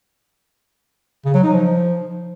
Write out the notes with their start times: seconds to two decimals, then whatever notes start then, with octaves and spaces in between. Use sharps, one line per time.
1.26 C#3
1.35 F#3
1.44 D#4
1.52 F3